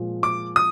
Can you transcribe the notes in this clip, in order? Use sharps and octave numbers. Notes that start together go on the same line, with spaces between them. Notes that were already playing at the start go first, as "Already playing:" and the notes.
Already playing: A#2 F3 G#3
D6
D#6